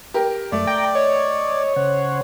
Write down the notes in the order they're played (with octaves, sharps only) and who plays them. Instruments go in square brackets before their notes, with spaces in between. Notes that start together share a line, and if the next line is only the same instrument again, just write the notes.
[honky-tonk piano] G4 A#4
[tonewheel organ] F#2 [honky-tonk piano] A3 [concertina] D5
[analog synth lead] G5 [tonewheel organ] A#5
[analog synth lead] C#5 [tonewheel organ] D#5
[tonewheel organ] C#3 C5 F#5